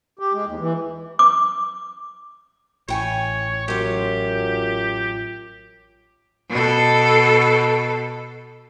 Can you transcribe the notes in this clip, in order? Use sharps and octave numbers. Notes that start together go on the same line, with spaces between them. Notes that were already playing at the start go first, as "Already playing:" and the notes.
G4
G#3
D#2
E3
D6
A1 E4 C#5 G5 G#5
F#2 F#3 F4 G4
B2 A4